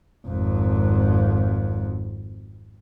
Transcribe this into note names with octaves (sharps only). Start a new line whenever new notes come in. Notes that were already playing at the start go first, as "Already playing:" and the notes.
G#1 F2